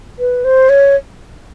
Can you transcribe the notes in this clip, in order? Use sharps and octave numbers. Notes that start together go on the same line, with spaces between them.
B4
C5
C#5